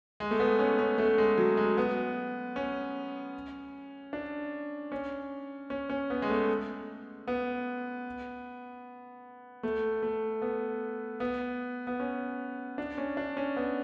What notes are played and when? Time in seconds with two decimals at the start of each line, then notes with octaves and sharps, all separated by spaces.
0.20 G#3
0.31 A3
0.40 B3
0.59 C#4
0.79 C#4
0.98 A3
1.18 G#3
1.38 F#3
1.57 G#3
1.78 B3
2.56 C#4
4.13 D4
4.92 C#4
5.70 C#4
5.90 C#4
6.10 B3
6.22 G#3
6.29 A3
7.28 B3
9.63 A3
10.02 A3
10.42 B3
11.20 B3
11.87 B3
12.00 C#4
12.78 D4
12.98 C#4
13.17 D4
13.37 C#4
13.57 B3